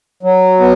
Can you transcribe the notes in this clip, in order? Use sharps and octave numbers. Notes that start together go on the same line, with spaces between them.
F#3
B3